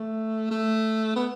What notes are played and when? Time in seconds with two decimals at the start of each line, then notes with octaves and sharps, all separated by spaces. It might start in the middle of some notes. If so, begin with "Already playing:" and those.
Already playing: A3
0.51 A3
1.16 B3